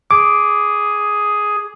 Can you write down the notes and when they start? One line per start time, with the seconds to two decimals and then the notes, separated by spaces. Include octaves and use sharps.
0.11 G#4 D6